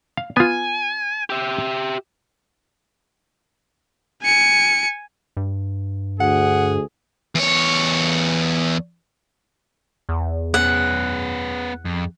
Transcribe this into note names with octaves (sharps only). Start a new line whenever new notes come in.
F5
B3 F4 G#5
G4 E5
G#5 C#7
G2
D2 G#4 F#5
E2 C#5
E2
B3 C#4 F#5
F2